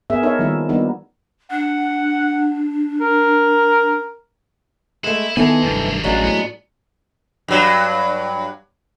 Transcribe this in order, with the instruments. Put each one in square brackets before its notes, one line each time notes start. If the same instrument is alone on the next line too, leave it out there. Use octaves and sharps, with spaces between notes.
[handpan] B3 G#4 A#4 E5
D#4 A4 A#4 C#5 E5
D#3 F3 G3 A#3 E4
F3 G3 A#3 B3 D4 D#4
[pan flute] D4 [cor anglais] F#5
[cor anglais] A#4
[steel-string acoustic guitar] G#3 A3 [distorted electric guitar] E4
[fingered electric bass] D#3 B3 [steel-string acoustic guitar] E3 E4 A4 [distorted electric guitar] D#5 G#5
[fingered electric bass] F1 G2 [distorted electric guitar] D#3 F#3
[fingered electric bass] A1 [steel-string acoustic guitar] F#3 G#3 D4 [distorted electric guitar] F4 B4
[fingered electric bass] A2 [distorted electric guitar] B3
[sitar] G2 F#3